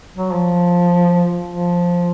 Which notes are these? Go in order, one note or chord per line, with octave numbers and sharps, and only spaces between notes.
F#3
F3
F3